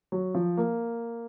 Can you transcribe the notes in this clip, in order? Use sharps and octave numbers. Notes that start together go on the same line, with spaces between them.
F#3
F3
A#3